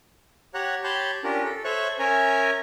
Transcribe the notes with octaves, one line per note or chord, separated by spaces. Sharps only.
G4 C#5 F#5 A#5 F#6
G4 C#5 A5 B5 C6 G6
C#4 D4 F4 G4 A#4
A4
A4 C5 C#5 E5 C#6 F#6
C#4 A#4 C#5 E5 G#5 A#5